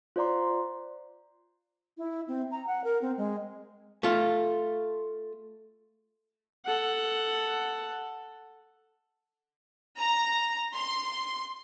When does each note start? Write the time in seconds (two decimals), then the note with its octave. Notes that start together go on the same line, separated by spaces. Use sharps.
0.16 F4 C5 D5 A#5 C6
1.98 E4
2.28 C4
2.51 A#5
2.67 F#5
2.84 A#4
3.02 C4
3.17 G#3
4.03 A3 F4
6.65 A4 F#5
9.98 A#5
10.75 C6